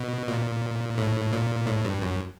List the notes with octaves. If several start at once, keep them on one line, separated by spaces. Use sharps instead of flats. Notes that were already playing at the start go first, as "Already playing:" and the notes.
Already playing: B2
A#2
A2
A#2
A2
G2
F#2